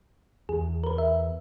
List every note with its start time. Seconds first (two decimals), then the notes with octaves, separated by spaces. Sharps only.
0.49 E2 G#4
0.84 A#4 B4
0.98 E5